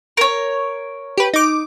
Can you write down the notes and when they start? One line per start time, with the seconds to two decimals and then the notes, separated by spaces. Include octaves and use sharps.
0.17 A#4 C#5
1.18 G4 B4
1.34 D#4 D6